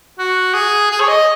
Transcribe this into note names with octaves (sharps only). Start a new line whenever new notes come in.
F#4
G#4
G#4
C#5
D#5